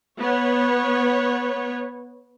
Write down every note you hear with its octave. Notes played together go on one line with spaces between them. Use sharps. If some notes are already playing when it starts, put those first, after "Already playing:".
B3 C#5